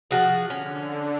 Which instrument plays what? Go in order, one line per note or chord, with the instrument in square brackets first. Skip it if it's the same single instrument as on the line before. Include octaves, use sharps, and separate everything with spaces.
[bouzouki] F3 F#4 G#4
[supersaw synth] D3 [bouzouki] C#4